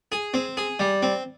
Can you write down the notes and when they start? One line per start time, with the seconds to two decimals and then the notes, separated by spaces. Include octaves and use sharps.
0.12 G#4
0.34 C4
0.57 G#4
0.80 G3
1.03 C4